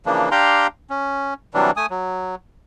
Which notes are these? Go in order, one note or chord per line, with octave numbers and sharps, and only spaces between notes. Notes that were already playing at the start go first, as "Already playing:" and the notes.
C#3 E3 F3 A#3 D4
D4 G4 F5 G5 A#5 C6
C#4
C3 E3 F#3 G3 D4
A3 G#5 D#6
F#3